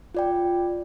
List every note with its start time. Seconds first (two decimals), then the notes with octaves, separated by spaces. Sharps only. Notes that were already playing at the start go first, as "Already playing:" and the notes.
0.15 F4 D5 G5